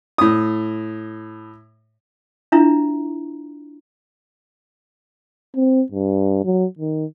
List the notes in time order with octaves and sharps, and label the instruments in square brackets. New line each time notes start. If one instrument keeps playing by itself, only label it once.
[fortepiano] A2 D#6
[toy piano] D4 E4 F4 E5 A#5
[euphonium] C4
G2
F#3
D#3